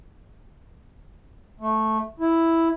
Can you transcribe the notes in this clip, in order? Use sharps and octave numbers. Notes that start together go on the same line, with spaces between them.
A3
E4